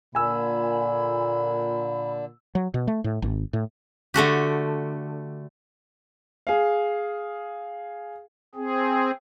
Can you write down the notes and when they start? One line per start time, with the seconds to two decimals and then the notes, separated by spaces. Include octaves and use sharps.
0.15 A#2 D3 G#5 B5 E6
2.55 F#3
2.74 B2
2.87 A3
3.04 A2
3.22 G#1
3.53 A2
4.14 D3 A3 F#4 G4
6.47 G#4 F5
8.55 C4 G#4